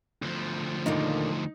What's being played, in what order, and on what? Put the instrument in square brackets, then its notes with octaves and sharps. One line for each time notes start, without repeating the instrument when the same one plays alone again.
[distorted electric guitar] D2 F3
[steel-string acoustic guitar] D#2 A#2 D3 [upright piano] D#4